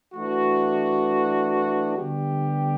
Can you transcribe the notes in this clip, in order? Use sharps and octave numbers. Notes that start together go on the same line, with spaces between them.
E3 A3 D4 F#4
D3 G3 B3 G4